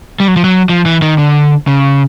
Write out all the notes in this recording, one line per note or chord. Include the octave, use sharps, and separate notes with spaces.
G3
F#3
F3
F#3
F3
E3
D#3
D3
C#3